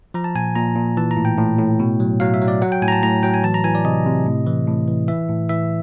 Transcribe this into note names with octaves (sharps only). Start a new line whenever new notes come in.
F3 A#5
A5
A#2 G#5
A#2 A#5
A#2
E3 A5
A#5
A2
G5
A2
A2
B2
F#3
F#3 F5
E5
F#3
D5
F#3 F#5
G5
A2 G#5
A#5
A5
A2 A#5
F#3 G5
G#5
E3 A5
A#5
E3 G#5
D5
C3 D#5
C3
A2
E3
A2
E3
E3 E5
A2
E3 E5